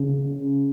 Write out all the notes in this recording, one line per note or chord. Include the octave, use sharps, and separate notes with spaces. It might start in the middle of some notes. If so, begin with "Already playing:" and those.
Already playing: C#3